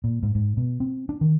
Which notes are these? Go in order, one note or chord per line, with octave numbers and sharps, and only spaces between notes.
A#2
G#2
G#2
B2
C4
D4
D#3